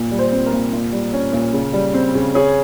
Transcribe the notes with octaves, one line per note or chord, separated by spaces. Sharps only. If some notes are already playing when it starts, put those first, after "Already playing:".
Already playing: A#2
G3
C5
C4
A#4
A#2
A#2
G3
C#4
A#2
C#3
G3
C4
C#3
C#4 G#4